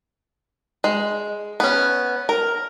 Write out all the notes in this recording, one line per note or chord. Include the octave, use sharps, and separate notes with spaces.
G#3
B3 C#4
A#4